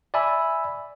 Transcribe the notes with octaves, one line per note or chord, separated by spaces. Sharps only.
D5 E5 G#5 B5 E6